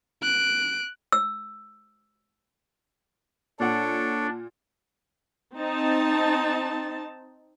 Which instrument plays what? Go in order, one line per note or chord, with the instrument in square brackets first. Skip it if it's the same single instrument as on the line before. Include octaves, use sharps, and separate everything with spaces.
[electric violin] F#6 D7
[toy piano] E6
[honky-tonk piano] A#2 F#5 [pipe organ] D4 [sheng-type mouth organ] A4 C#5 D5
[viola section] C4 D#4 A5